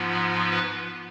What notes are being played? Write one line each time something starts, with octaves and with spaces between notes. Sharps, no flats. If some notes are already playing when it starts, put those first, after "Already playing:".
Already playing: G#2 F3 B3 F4
B4